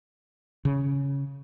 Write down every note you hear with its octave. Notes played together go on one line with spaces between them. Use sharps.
C#3